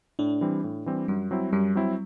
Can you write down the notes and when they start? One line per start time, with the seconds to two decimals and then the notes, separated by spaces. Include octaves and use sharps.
0.19 A2 D4
0.41 E3 G3 C4
0.64 A2
0.86 E3 G3 C4
1.08 F#2 G3
1.31 F#3 C4 E4
1.53 F#2 G3
1.75 F#3 C4 E4